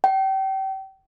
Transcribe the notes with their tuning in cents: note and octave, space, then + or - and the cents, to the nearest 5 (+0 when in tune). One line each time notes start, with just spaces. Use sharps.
G5 -30